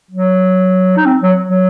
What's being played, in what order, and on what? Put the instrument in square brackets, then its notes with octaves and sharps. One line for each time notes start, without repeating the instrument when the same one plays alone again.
[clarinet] F#3
D#4
C4
F#3
F#3